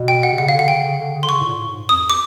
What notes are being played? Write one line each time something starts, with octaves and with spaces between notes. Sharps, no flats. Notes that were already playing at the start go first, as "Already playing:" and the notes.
Already playing: B2
G5
F#5
C3
C#3 F#5
F5
D3
F#5
C#3 G5
C#3
D3
C#3
D3 C6
C#3 C#6
A2
A#2
A2
G#2
F2 D#6
D6